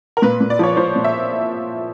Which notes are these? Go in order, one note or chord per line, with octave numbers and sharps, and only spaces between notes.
A#4
A#2 B4
A#2
D5
F3 C#5
F3 C5
A#2
E5